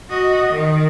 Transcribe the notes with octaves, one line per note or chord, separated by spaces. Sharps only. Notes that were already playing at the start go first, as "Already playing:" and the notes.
F#4 D#5
D#3